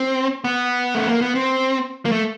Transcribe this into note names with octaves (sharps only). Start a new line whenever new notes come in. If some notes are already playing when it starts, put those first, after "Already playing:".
Already playing: C4
B3
A3
A#3
B3
C4
A#3
A3